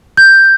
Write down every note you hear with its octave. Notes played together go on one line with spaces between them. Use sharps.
G6